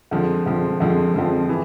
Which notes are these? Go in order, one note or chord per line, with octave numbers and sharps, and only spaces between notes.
F2 D3 F3 G#3
F2 D3 F3 G#3
F2 D3 F3 G#3
F2 D3 F3 G#3
E3